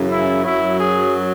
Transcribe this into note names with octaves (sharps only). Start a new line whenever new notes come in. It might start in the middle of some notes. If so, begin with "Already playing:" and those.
Already playing: F#2 C#3 E3
E4
F#2 F#3 E4
G#4